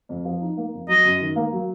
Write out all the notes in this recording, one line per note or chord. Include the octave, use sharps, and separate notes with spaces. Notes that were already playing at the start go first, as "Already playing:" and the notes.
F2
F3
D#4
A#3
F2
F#3 D#5
F#2
D#3
A#3
F#3